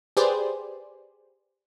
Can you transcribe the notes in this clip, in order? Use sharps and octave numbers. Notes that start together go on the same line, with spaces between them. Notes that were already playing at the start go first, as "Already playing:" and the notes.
G4 G#4 B4 C5 D5